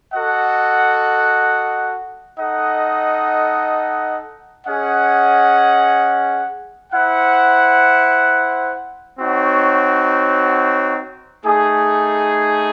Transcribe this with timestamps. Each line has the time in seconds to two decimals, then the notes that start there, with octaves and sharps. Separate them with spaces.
0.13 F#4 A4 D#5 F#5
2.39 D#4 A4 D#5 F#5
4.66 C#4 G#4 D#5 F#5
6.93 E4 C5 F#5
9.20 C4 D#4 F#4 C#5 F#5
11.46 A3 D#4 G#4